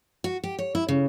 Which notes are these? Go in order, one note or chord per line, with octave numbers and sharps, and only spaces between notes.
F#4
G4
C#5
E4
C#3